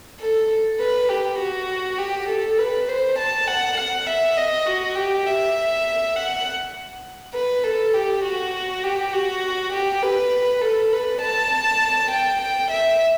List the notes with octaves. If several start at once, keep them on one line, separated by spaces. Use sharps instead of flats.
A4
B4
G4
F#4
G4
A4
B4
C5
A5
F#5
F#5
E5
D#5
F#4
G4
E5
F#5
B4
A4
G4
F#4
G4
F#4
G4
B4
A4
B4
A5
G5
G5
E5